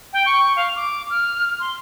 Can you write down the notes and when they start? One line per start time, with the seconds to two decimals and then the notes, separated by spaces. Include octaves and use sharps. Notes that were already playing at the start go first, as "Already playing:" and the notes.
0.13 G5
0.26 C#6
0.56 F5
0.76 D6
1.10 F6
1.60 C6